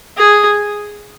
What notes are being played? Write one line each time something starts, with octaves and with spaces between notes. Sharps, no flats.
G#4